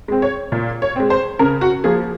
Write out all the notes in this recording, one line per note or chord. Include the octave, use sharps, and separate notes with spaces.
G#3 C4
C#5
A#2
C#5
G#3 C4
C5
C#3 A#4
F#4
F3 A#3 G#4